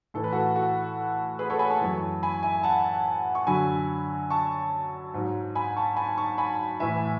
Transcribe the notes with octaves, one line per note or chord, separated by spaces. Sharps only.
A2 E3 A4
B4
F#4 A4
F#4 A4
G#4 B4
A4 C#5
G#5 B5
A5 C#6
F#2 E3
G#5 B5
E5 G#5
F#5 A5
C#6
F#2 D3 F#3 G#5 B5
A5 C#6
G#2 F#3
G#5 B5
A5 C#6
G#5 B5
A5 C#6
G#5 B5
A2 E3 E5 G#5